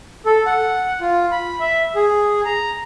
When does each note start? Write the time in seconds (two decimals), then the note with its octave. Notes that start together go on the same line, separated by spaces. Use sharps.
0.26 A4
0.46 F#5
1.01 F4
1.31 B5
1.60 E5
1.96 G#4
2.45 A#5